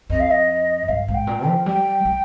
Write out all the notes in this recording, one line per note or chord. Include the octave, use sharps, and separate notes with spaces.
F2 D#5
F5
D#5
G2 F5
G#2
G5
A#2
G5
F3
G3 G5
G3